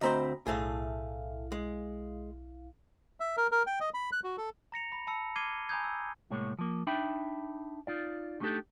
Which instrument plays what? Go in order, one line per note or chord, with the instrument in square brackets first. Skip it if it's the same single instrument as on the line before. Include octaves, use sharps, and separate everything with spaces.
[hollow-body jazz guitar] D2 C4 C5 [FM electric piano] D#5 A#5 B5
[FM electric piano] B1 E4 F5 [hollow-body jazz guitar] A2 A3 G#4
[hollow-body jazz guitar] G#3
[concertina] E5
A#4
A#4
G5
D#5
B5
F#6
F#4
A4
[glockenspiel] A#5 A#6 C#7 F7
B5
A5 B5 E6 C#7
D6 F6 G#6 C7 D#7 G7
G#5 A#5 B5 D#6 G6 G#6
E6
[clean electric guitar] C2 A2 G#3 A#3 C#5
F3 A#3
D4 D#4 E5 G5 B5
D#4 F4 D5
G3 A3 D4 D#4 G4 A4